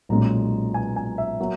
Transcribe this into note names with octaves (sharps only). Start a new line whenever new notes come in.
B1 A#2 G#3 C#4 A#5
G#5
G#5
E5
F#3 A#3